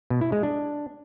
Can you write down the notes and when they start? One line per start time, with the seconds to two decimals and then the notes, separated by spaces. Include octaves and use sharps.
0.10 B2
0.21 E4
0.32 G#3
0.43 D4